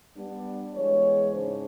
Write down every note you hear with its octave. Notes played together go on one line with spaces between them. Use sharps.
G3 B3 D4
E3 G#3 B3 C#5
G#2 C#3 D4 C5